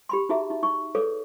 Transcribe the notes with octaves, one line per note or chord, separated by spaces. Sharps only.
G4 B5 C6
D#4 F#4 G#4 E5 A#5
D#4
D#4 C#6
G#4 A4 B4 C#5 D5